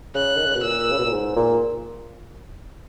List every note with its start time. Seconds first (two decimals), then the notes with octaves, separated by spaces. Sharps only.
0.15 C#3 F#6
0.37 D#3
0.46 C#3
0.55 B2
0.63 A#2 E6
0.92 C#3
0.98 B2
1.05 A#2
1.12 G#2
1.36 A#2